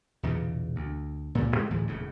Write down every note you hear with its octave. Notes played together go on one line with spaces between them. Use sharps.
B1 E2 A#2 C#3
D2
C#2 G2 A#2
A2 C3 G#3 A3
D1 A2 E3 F3
E1 E2 A2 C#3